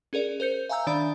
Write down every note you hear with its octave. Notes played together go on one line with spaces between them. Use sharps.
C#4 G#4 A#4 D5
A#4 C5 G6 C#7
E5 F5 G#5 A#5 E6 G6
D#3 D4 D5 B5